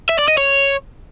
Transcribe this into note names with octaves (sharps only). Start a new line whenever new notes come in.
E5
D5
D#5
C#5